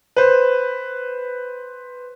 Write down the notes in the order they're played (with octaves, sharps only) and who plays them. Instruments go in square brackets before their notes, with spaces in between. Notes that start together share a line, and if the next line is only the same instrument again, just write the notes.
[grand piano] B4 C5